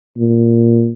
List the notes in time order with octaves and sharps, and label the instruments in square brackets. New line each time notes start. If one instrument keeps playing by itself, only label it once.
[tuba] A#2